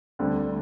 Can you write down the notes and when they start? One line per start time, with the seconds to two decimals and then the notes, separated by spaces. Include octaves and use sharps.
0.19 D2 D3 G3 C4 A4